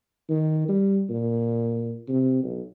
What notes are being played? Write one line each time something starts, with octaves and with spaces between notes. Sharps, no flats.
D#3
G3
A#2
C3
B1